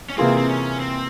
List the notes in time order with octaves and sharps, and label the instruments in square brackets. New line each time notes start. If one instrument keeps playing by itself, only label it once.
[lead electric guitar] C#4
[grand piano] C3 E3 A#3 F4 G#4 [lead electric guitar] C4
[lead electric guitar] C4
C#4
C4